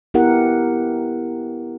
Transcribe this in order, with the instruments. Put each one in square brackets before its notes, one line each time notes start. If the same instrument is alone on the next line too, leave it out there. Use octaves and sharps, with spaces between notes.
[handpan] B3 E4 G4 A#4 F#5